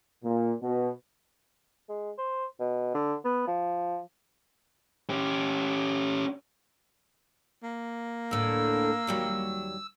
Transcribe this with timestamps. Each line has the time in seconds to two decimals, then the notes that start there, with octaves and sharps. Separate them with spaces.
0.24 A#2
0.62 B2
1.89 G#3
2.18 C5
2.60 B2
2.95 D3
3.25 B3
3.47 F3
5.10 C#4 G4
7.63 A#3
8.31 D2 A2 E6
9.07 D#2 F#3 G3